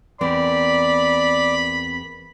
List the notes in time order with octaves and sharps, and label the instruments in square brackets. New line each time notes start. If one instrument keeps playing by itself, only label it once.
[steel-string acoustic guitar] E2 C4 A#4 [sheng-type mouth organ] D5 [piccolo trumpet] B5